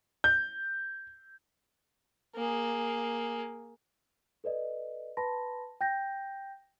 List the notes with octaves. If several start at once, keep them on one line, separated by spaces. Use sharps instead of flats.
G6
A#3 G#4
A4 B4 D5 D#5
B4 A5 B5 C6 A#6
G5 G6 A#6